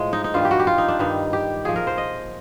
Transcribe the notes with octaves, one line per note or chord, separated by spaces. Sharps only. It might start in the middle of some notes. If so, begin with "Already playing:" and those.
Already playing: A2 F3 G#3
D#4
D#4
G2 D#3 G3 F4
G4
F#4
G4
F4
D#4
D4
G2 D#3 G3 D#4
G4
A#2 F3 G#4
A#4
C5
D#5